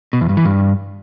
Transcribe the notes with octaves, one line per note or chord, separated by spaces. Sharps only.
B2
E2
G2
E3
G2